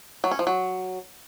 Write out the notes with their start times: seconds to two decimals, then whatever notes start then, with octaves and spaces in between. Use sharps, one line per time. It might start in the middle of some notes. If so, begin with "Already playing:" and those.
0.24 F#3
0.31 C#4
0.39 F3
0.47 F#3